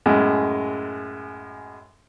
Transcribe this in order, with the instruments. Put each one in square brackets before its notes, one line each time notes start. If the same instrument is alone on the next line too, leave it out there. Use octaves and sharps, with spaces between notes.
[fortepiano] F#2 A2 G#3